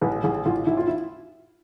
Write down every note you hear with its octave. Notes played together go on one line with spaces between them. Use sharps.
A1 B4
A1 G#4
A1 F4
A1 E4
F4
E4